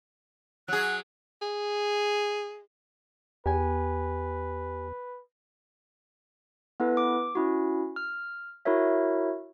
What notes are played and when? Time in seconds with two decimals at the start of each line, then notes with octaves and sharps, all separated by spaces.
0.68 F#3 G#4 F#6
1.42 G#4
3.46 E2 G4 B4 G#5
6.80 B3 E4 A4 B4
6.97 D6
7.35 C#4 E4 F#4
7.96 F6
8.65 E4 F#4 A#4 C#5 E5